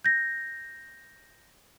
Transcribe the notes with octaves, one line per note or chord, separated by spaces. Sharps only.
G6 A#6